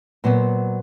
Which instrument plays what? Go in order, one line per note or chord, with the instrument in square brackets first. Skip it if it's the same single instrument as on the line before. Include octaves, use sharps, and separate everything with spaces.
[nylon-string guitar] A#2 F#3 B3 C5